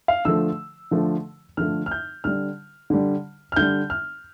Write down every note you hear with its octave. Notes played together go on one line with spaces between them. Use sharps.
F5
D3 F3 A3 E6
D3 F3 A3
D3 F3 A3 F6
F6
G6
D3 G3 F6
D3 G3
F6
D3 G3 G6
F6